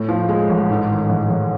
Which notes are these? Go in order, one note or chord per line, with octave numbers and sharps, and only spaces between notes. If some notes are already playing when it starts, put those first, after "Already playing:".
Already playing: A2
F3
G#3
A1
G#2
D#3
A1
A1